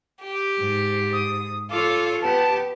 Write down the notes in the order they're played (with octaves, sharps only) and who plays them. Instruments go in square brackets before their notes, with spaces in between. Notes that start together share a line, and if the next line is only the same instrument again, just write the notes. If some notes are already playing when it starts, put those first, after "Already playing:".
[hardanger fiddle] G4
[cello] G#2
[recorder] D#6
[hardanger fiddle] F4 [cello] A4 C#5 [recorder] D6
[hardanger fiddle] B3 [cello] G4 [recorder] A5